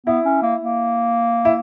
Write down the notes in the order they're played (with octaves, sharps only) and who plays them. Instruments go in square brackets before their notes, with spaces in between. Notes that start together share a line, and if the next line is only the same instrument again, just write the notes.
[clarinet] B3 [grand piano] E4
[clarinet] C#4
A#3
A#3
[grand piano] E4